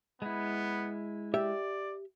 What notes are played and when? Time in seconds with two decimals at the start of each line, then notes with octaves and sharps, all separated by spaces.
0.22 G#3 B3 E4
1.34 G4 D5 E5